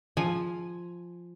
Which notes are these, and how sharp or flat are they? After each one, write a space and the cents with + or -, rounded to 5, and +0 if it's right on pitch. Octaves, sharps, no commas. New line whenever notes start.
F3 +0 G#5 +0